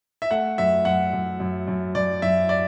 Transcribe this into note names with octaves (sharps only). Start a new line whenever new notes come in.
E5
A3 F#5
F#2 E5
F#2 F#5
F#2
F#2
F#2
F#2 D5
F#2 E5
D5